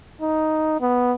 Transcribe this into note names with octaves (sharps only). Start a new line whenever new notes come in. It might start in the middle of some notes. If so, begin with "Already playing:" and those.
D#4
B3